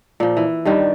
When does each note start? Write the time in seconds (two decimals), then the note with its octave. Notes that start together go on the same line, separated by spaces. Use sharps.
0.20 A#2 F3
0.37 E3
0.65 G2 D#3 G3